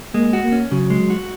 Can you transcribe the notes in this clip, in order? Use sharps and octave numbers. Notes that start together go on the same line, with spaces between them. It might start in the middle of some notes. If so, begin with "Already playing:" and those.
G#3 A#3
F#4
A#3
C#4
C#3 F#3
G#3
F#4